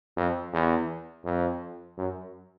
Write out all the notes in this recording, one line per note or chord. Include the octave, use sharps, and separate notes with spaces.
F2
E2
F2
F#2